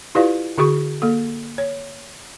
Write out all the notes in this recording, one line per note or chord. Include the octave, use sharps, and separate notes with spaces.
E4 F4 G4 B4 D5 F5
D3 F#4 G#4 C#6
A#3 A4
C#5